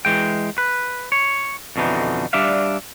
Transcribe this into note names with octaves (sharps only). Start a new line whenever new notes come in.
E3 G#3 G5
B4
C#5
F2 B2 D3 E3 D#4
G3 D4 D5 E5 F5